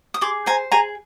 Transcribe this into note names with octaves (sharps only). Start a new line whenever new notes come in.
D#6
G#4 C6 D6
C5 G#5 A#5
G#4 G#5 A#5